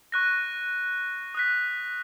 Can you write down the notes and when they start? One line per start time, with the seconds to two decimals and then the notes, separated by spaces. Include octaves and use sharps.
0.12 C#6 F#6 A#6
1.35 D#6 F#6 B6